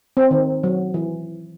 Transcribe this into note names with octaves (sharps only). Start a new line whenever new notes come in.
C4
D#3
F#3
E3